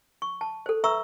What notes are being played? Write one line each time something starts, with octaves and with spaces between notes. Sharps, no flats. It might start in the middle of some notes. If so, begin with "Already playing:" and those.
C#6
A5
A4 C5
B4 E5 A#5 C#6 E6